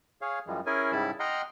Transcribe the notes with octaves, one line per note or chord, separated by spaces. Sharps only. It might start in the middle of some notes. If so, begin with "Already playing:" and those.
G#4 C#5 F5
F#2 E3 F3 G3 G#3
C#4 E4 G#4 A#4 G#5
G#2 C#3 G3 E4 A5 B5
D#5 F#5 G5 A#5 C6 F6